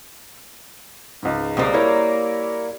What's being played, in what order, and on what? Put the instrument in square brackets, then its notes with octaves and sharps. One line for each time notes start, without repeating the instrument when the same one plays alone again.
[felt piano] C#2 G#2
[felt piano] C#2 C4 D#6 [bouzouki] G3 A#3
[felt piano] E4 A#4 C#5